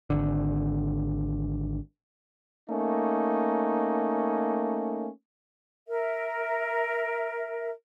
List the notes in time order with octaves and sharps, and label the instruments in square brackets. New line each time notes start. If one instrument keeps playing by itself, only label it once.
[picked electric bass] G#1 D3
[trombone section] A3 A#3 C#4 D#4
[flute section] A#4 E5